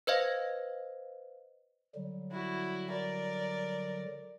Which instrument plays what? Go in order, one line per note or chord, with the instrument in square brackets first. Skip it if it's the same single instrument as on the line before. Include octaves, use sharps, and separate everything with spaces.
[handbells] B4 C5 D#5 F5
[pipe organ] D3 F#3 G3
[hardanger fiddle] E4 F#4
A#4 D5